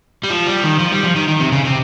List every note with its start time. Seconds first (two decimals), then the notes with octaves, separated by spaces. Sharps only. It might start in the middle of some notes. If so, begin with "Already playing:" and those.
0.24 G3
0.30 F3
0.47 G3
0.64 D#3
0.79 F3
0.92 G3
1.04 F3
1.16 D#3
1.28 D#3
1.40 C3
1.52 C#3
1.65 C3